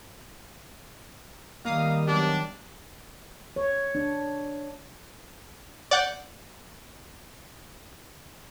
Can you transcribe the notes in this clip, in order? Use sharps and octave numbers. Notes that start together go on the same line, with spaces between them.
D#3 G3 A#3 F5 A#5 D#6
F#3 B3 D4 G4
C#5
D4
D5 F#5 G6